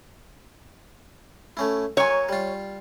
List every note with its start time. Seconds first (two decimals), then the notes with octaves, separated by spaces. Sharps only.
1.57 A3 C#4 E4
1.97 F#3 A#3 C#5 G#5
2.29 G3 F4